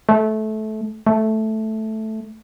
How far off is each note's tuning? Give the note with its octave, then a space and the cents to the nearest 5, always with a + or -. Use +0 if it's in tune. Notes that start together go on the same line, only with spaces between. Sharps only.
A3 -20
A3 -5